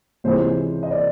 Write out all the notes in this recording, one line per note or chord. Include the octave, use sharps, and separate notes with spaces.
C#2 C3 E3 G#3 C#4 C5
D#5
D5